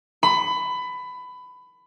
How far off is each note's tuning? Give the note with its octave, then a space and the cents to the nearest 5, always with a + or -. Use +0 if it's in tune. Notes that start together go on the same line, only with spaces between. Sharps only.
B5 +20